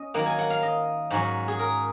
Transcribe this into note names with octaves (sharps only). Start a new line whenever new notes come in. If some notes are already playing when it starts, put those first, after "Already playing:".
Already playing: C#4 D#5
D#3 F#3 A#3 F#5
G#5
F#5
F5
D#5
G#2 F#3 C#4 F#4
G#4
A#4